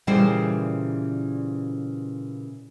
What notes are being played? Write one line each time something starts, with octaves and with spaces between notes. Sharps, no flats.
A#2 C#3 E3 G3 C5 G5